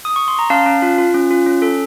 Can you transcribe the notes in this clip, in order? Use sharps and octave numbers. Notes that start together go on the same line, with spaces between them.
D#6
C#6
C6
A#5
C#4 F5 A5
C#4
F4
F4
C#4
F4
C#4
A4